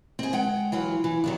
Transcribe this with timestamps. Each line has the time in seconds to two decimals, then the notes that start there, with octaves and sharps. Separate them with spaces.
0.19 C4 G#4
0.33 G#3 F#5 G5
0.72 E3 F#3 F4
1.04 E3
1.24 G2 D#3 F#3